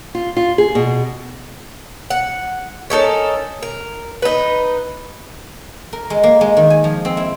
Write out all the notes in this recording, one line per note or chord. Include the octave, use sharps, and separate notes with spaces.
F4
F4
G#4
B2
F#5
C#4 D#4 A4 A#4
A#4
D#4 B4
A#4
G#3
A#3
G#3
D#3
G#5
F3
C4
E4